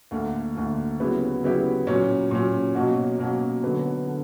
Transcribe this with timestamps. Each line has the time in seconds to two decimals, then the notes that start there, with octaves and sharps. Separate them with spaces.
0.11 D2 D3 A#3
0.55 D2 D3 A#3
1.00 C#3 F#3 B3 E4 G4
1.43 C#3 F#3 B3 E4 G4
1.87 A#2 F#3 C#4
2.31 A#2 F#3 C#4
2.75 B2 F#3 A#3 C#4 F#4
3.19 B2 F#3 A#3 C#4 F#4
3.63 D3 F#3 B3
4.07 D3